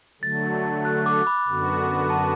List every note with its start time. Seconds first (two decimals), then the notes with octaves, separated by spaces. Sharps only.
0.22 D3 F#3 A3 A6
0.85 F#6
1.06 D6
1.27 B5
1.47 F#2 D3 B3 F#4
2.10 A5